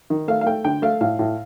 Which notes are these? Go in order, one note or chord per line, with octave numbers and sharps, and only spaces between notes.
D#3
A3 F5
F5
A3 G5
D3 G5
A3 F5
A2 F5
A2